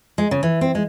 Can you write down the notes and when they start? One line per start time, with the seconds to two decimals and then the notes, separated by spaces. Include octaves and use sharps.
0.18 G#3
0.31 C#3
0.43 E3
0.61 C4
0.75 G#3